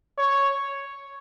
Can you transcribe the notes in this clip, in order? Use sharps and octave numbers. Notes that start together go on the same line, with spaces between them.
C#5